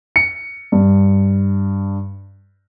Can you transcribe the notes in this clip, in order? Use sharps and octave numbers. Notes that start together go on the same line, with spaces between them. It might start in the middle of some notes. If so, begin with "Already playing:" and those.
C#7
G2